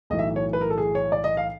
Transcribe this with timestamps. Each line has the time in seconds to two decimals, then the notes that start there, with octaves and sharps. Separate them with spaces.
0.10 B1 A2 E3 D#5
0.19 E5
0.36 C#5
0.53 B4
0.61 A#4
0.70 A4
0.78 G#4
0.95 C#5
1.12 D5
1.24 D#5
1.37 F5